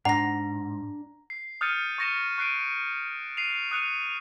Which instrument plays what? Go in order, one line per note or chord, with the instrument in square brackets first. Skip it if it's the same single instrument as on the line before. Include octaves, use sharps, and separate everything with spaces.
[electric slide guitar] G#2 [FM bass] D4 [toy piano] F#5 [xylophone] A#5 A#6
[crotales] C7
D#6 F6 G6 A6 C#7 D#7
C#6 A6 A#6 C#7 D#7 E7
C#6 F#6 C7 D7 D#7
C7 D#7 F7
D#6 F#6 C#7 D#7